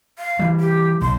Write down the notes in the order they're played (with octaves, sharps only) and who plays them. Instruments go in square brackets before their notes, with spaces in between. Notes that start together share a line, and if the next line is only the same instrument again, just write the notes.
[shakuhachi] F5
[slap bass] E3 G3
[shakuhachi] G4
[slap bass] B1 [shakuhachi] C6